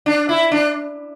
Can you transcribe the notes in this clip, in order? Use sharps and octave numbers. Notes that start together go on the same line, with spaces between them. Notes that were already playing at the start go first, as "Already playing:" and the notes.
D4
E4
D4